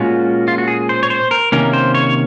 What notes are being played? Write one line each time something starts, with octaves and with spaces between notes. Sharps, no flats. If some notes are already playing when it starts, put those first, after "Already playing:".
Already playing: A#2 G#3 C#4 F4 F#4
F4
F#4
G#4
C5
C#5
C5
A#4
C3 D#3 A#3 C#4 A#4
C5
C#5